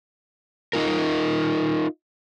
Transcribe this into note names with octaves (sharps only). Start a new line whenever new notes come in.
D#4 F4 A#4